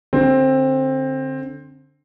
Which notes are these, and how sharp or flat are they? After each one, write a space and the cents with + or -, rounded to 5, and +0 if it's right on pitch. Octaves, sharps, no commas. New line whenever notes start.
D3 +0 C4 +15